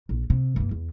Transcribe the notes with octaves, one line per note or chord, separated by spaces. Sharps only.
A#1
C3
G2 A#3
E2